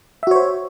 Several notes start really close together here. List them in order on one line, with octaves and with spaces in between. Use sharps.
E5 F#4 C#5 C5